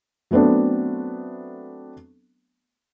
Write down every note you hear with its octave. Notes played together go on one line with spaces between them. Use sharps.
F#3 A3 B3 C4 D4